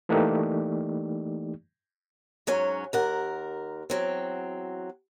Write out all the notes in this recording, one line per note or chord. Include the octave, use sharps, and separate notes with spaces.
E3 A3 A#3 D#4 G4 D5
G#2 F#3 C#4
D#2 A#4 F#5
E2 F#3 C4